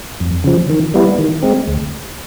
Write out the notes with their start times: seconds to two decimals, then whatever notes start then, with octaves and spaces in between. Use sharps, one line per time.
0.20 F2
0.44 C#3 F3
0.70 D#3
0.94 G3 B3 E4
1.19 D#3
1.43 G#3 C4
1.68 D2